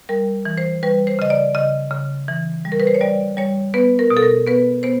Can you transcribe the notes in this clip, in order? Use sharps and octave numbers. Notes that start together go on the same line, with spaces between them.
G3 A#4
E3
C5
G3 B4
C5
C#3 D#5
D5
C#3 D#5
C#3
E3
G3
A#4
B4
C5
C#5
G3 D5
G3 C#5
B3 B4
A#4
B2
A4
A#4
B3 B4
B3 C5